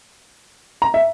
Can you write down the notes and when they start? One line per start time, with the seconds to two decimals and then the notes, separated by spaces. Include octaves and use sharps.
0.82 A#5
0.94 E5